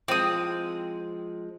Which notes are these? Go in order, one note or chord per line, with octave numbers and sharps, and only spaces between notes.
F3 G#3 C4 D#6